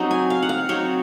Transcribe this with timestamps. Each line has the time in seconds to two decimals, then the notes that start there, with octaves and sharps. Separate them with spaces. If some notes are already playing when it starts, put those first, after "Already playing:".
Already playing: F#3 C4 D#4
0.11 G#5
0.30 F5
0.42 F#5
0.49 F5
0.69 F#3 C4 D#4 C#5